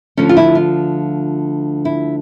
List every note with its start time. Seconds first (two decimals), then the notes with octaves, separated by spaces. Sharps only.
0.17 D2 D3 F3 C#4
0.29 F4
0.37 E4
0.55 F4
1.85 E4